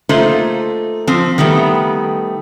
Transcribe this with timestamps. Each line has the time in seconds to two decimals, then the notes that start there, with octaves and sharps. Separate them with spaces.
0.09 A3 A#3 D#4 F4 C5
1.07 F3 C4
1.38 D#3 G3 A3 B3